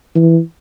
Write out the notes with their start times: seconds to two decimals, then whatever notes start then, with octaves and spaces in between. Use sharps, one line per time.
0.15 E3